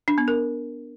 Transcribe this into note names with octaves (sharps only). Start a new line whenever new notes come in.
D4
B3
A#4